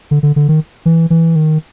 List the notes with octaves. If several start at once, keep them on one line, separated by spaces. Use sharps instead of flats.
D3
D3
D3
D#3
E3
E3
D#3